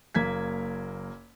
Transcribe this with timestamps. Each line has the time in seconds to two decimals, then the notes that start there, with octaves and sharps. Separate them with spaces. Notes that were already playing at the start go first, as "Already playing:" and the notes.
0.15 F#1 A#3 G#6 B6